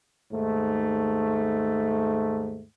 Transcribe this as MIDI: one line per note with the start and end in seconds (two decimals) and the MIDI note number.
0.32 2.62 39
0.32 2.62 44
0.32 2.62 57